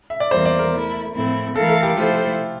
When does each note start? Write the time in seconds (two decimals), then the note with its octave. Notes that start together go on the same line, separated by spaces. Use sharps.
0.10 E5
0.20 D5
0.31 E2 E3 G3 A#3 C5
0.45 D5
0.59 A#4
0.72 A3 E4 A4
1.14 A2 F3 C4 E4 A4
1.55 E3 A3 E4 A4 A#4 F5
1.69 A4
1.82 G4
1.96 F3 A3 E4 F4 A4 C5